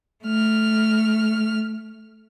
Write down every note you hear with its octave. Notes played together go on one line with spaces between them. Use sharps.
A3 F6